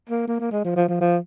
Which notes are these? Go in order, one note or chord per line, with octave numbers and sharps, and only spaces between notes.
A#3
A#3
A#3
G#3
F3
F3
F3
F3